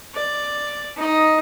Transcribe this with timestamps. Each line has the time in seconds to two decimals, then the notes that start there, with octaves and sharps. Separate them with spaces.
0.14 D5
0.97 D#4 D#5